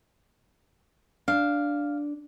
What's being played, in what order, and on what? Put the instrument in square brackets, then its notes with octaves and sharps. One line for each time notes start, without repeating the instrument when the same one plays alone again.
[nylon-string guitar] D4 [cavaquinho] F5